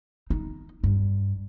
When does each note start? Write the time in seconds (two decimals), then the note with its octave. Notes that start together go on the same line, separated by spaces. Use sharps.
0.30 D#4
0.84 G2